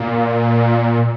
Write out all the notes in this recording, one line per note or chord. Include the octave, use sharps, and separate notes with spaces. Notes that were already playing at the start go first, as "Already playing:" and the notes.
Already playing: A#2